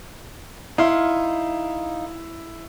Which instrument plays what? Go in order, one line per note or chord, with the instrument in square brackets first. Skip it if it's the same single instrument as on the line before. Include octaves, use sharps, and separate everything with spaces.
[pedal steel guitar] D#4 F5 C6 [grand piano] E4